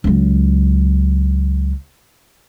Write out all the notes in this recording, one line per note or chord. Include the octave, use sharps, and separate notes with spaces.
C#2 F#3